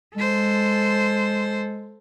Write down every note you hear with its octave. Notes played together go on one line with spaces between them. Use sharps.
G#3 A4 C5